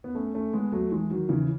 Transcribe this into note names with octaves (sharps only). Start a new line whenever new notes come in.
B3
A3 C#4
A3 C#4
G#3 B3
F#3 A3
E3 G#3
D#3 F#3
C#3 E3